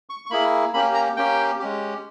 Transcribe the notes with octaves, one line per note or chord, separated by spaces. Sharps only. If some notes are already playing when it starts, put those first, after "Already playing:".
C#6
C#6
A#3 E4 G#4 B5
A#3 C#4 G4 B5
A#5
A#3 C#4 G4 G5
G#3 C#4 G4